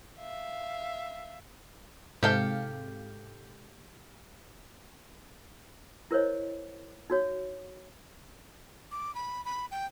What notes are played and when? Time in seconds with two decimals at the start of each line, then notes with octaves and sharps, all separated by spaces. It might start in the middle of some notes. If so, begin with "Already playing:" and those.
0.18 E5 F5
2.23 G#2 C3 G4 A4 F5 G5
6.11 E4 A#4 C5 C#5 D#5
7.10 D#4 F#4 C#5
8.92 D6
9.15 B5
9.45 B5
9.71 G5